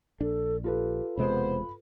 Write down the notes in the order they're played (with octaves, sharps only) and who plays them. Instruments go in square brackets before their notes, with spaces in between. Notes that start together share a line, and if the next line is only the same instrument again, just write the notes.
[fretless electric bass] A#1 D4 [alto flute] A4
[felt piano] F4 A4 B4 [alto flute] G4
[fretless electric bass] E1 C3 G#3 [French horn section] B3 C5 [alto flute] B5